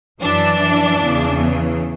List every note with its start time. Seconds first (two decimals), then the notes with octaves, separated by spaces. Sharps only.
0.21 F#2 E3 D4
1.00 E2 C#3 E3